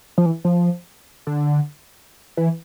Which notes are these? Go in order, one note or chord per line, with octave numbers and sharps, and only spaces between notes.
F3
E3
F3
D3
E3